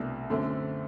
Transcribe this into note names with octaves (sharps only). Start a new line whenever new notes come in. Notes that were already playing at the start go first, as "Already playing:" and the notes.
Already playing: C2 B2 A3 D4
F#2 D3 A3 C4